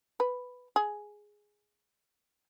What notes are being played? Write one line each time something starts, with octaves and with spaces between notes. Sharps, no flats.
B4
G#4